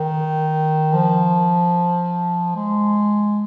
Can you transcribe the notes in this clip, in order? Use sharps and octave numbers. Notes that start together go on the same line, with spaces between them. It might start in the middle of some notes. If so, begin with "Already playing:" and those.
Already playing: D#3
F3
G#3